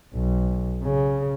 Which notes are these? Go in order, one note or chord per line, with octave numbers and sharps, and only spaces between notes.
B1
C#3